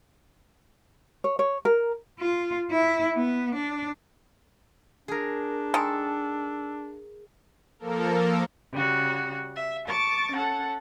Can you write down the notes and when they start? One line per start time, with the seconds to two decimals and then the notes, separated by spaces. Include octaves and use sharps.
1.24 C#5
1.39 C#5
1.65 A#4
2.19 F4
2.71 E4
3.16 B3
3.55 D4
5.08 D4 G#4 A#4
5.74 D#3 G#3 A4
7.79 F3 A#3 A4 A#4
8.72 C#3 G3 F#4
9.55 E5
9.86 A5 C#6 D6 A6
10.33 C#4 A4 F#5